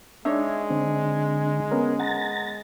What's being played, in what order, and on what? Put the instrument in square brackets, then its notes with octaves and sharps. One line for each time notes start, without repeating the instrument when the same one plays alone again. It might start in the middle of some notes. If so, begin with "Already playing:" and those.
[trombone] G#3 [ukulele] D4 D#4 C#5 [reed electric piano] E5
[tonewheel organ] D3 [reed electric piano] C4
[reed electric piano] B3 C#4 A#4
[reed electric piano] F#5 [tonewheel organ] A#5 A6